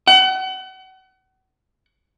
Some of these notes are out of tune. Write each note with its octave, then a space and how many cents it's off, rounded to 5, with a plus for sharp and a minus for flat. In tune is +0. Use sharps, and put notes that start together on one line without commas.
F#5 +35